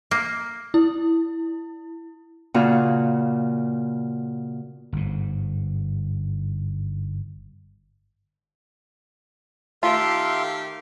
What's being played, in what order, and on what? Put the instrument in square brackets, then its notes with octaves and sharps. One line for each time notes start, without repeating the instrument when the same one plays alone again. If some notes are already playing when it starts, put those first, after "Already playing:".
[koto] A#3
[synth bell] E4
[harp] A#2 C#3 F4 F#4
[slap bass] G1 G#2
[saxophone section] D#3 G4 F5 [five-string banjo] A3 F4 [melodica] A4 E5 C6